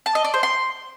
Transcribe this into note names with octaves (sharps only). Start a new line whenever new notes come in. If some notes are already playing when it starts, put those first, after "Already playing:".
A5
D#5
D5
C5
C6